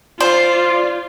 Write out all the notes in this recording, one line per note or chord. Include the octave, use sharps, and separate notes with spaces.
F4 C5 D5